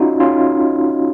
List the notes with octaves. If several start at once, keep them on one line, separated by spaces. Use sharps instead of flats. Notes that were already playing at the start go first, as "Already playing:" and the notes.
Already playing: C#4 D#4 F4 F#4
C#4 F4